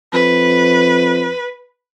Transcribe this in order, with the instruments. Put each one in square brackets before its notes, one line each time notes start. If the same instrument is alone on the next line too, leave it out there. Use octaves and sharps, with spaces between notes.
[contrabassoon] F2 [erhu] B4